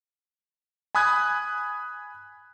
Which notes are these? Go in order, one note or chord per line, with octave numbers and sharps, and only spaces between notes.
G#5 B5 D#6 F#6 G#6